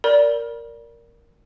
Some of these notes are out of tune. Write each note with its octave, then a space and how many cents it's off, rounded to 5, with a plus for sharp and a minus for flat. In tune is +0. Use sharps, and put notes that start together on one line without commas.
A#4 +0 D5 -15 B5 -40